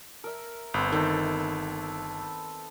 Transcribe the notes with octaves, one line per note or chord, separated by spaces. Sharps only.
A#4 E5
G1 B3 C4 C5
D#3 A4 E5 G5